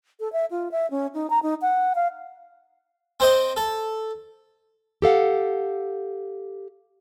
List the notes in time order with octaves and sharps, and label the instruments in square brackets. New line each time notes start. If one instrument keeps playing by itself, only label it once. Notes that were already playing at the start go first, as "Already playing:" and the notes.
[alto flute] A4
E5
F4
E5
C#4
D#4
A#5
D#4
F#5
F5
[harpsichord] C4 C5 D#5
A4
[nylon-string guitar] G4 A4 F5 F#5